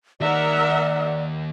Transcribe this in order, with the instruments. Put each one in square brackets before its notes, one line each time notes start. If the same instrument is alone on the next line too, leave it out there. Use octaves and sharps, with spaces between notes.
[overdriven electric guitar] D#2 D#3 [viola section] A#4 E5 F#5 [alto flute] D5